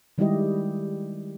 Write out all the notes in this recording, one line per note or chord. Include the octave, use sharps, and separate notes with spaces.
D#3 G3 G#3 E4 G4 D#5